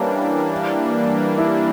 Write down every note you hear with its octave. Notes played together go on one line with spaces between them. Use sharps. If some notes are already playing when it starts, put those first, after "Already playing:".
Already playing: E3 G3 A#3 C#4 D4
E4